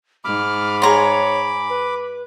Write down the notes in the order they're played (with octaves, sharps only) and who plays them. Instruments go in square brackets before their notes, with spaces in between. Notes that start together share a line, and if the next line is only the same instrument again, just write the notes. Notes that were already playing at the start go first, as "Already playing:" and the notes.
[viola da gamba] G#2 [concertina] B5 D6 [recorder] F6
[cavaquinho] G#4 A#5 C6 [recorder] C#5
[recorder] B4